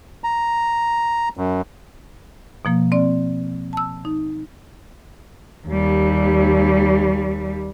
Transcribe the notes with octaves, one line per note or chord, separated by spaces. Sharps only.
A#5
F#2
B2 F3 A#3
C4 D5
A5 E6
D#4
D#2 G3